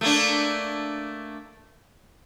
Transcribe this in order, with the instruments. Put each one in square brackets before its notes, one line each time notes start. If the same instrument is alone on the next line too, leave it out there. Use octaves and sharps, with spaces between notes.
[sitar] A3 A#3 D4